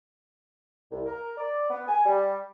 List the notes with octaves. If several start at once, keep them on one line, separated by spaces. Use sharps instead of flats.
C2
A#4
D5
B3
G#5
G3